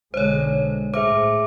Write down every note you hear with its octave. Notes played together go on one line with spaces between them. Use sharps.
B1 D3 G#3 C5 C#5
A2 G#4 C5 E5 D6